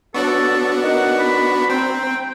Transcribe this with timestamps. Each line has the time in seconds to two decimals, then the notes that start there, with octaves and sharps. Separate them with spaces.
0.14 B3 D4 F#4 A4 C#5 C#6
0.84 D#4 A#4 D#5 F#5
1.19 B5
1.70 C4 G5 A#5 C6